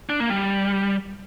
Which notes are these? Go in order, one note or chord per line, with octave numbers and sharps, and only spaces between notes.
D4
A#3
G3